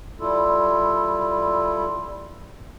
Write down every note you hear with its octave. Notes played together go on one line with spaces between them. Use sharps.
G3 E4 F4 A4